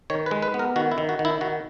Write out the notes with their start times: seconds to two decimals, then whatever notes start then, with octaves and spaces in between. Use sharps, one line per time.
0.10 D#3 C#5
0.26 B4
0.31 G#3
0.42 B4
0.54 B3
0.59 A#4
0.76 D#3 F#4
0.92 E4
0.98 D#3
1.09 F#4
1.19 D#3
1.25 E4
1.41 D#3 F#4